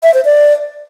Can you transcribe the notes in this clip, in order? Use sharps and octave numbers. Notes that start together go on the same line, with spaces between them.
E5
C5
D5